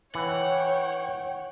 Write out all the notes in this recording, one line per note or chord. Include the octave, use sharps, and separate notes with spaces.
E3 C#5 F#5 G5